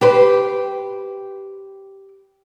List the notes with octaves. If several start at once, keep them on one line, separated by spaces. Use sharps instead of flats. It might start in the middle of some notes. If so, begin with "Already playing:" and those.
G4 B4 C5